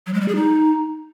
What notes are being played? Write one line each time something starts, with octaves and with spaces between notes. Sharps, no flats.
F#3
G#3
G3
G#4
D#4